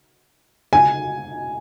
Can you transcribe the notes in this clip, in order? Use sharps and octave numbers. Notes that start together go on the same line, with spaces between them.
G#5